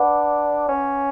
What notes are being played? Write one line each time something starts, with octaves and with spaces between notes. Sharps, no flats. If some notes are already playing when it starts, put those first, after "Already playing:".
Already playing: D4 B4 F#5 B5 D6
C#4